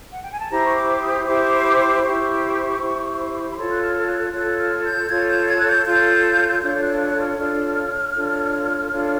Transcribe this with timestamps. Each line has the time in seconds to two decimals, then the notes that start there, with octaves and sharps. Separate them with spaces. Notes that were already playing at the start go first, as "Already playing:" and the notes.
0.12 F#5
0.22 G5
0.31 G#5
0.40 A5
0.50 E4 G4 C5 A#5
0.66 C#6
0.75 D6
1.01 D#6
1.26 E4 G4 C5 D6
2.03 E4 G4 C5 C#6
2.79 E4 G4 C5
3.51 B5
3.56 F4 A4 C#5 C6
3.71 F#6
3.82 F6
4.07 F#6
4.32 F4 A4 C#5 F#6
4.59 F6
4.84 G6
5.09 F4 A4 C#5 G#6
5.29 G6
5.47 G#6
5.59 F#6
5.66 G6
5.86 F4 A4 C#5 G6
6.62 D4 F4 A4 C#5 G6
6.82 F#6
7.01 F#6
7.19 F6
7.38 D4 F4 A4 C#5 F6
8.16 D4 F4 A4 C#5
8.91 D4 F4 A4 C#5